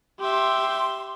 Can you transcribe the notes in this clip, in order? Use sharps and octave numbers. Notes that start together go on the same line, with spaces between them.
G4 E5 C6